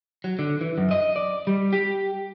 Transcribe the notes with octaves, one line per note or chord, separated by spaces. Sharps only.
F#3
D3
E3
F#2
D#5
D5
G3
G4